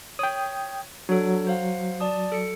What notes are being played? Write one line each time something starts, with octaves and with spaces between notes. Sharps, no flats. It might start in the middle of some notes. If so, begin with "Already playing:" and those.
C#5 G5 D#6
F#3 D4 A4
C5 F5 F#5
D5 A5 D#6
A4 C#7